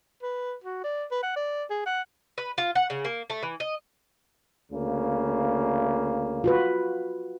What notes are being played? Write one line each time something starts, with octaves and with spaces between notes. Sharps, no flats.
B4
F#4
D5
B4
F#5
D5
G#4
F#5
B4
F4
F#5
C#3
A#3
A3
E3
D#5
D2 C#3 A#3
F4 F#4 B4